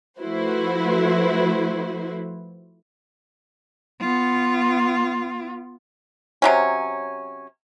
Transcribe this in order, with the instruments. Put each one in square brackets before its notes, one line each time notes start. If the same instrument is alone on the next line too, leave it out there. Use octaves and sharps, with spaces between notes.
[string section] F3 A3 E4 F#4 B4 C5
[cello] B3 F4
[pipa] C3 F#3 C#4